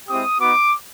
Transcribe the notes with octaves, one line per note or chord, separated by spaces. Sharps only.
G#3 C4 E4 G4 D#6
B3 D#4 F#4 D6